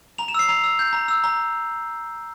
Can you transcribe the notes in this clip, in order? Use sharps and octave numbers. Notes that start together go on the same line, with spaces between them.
A#5 F7
E7
E6 C7
A#5 F7
E6
G6
A#5
E6
A#5